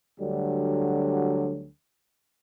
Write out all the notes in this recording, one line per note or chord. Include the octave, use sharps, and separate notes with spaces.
D2 D3 F#3 G3